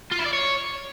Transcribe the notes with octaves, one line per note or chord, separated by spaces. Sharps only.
F4
E4
D5
C#5